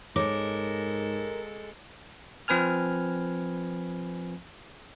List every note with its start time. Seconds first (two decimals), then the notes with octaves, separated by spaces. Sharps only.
0.16 G#2 G#3 A4 A#4 C#5 D6
2.48 F3 C4 B4 G#5 F6